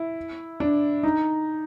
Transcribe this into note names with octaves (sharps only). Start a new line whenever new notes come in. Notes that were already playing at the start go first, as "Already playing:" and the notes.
Already playing: E4
D4
D#4